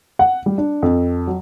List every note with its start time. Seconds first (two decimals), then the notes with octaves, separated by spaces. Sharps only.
0.19 F#5
0.46 G3
0.58 D4
0.83 F2
1.27 F#3